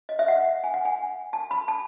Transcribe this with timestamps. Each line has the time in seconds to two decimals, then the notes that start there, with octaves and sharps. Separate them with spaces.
0.09 D#5
0.19 E5
0.28 F#5
0.64 G#5
0.74 F#5
0.85 G#5
1.33 A5
1.51 B5
1.68 A5